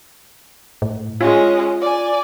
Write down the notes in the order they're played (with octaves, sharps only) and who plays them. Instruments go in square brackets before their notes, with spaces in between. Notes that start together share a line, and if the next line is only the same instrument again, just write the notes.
[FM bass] A2
[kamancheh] G#3 C#4 [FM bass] F4
[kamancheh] D5 G#5